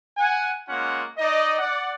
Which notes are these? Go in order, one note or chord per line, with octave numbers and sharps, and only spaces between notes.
F#5 G#5
G#3 A#3 C#4 F4 F#5
D#4 D5 D#5
D5 F#5